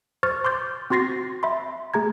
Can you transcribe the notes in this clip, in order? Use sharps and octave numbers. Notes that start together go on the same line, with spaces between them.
C5 C#6 F6 A6
C6 D6 G6 A6
C4 F#4 C6 A6 A#6 C7
E5 B5 C6
A3 G#4 A#5 G#6